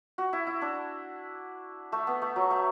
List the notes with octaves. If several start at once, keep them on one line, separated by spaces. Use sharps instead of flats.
F#4
E4
E4
D4
A3
B3
A3
F#3
A3